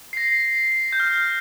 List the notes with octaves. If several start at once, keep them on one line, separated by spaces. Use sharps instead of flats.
C7
A#6
G6
F6
G6